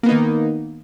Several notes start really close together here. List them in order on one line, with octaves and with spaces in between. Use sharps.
A#3 B3 D#4 D#3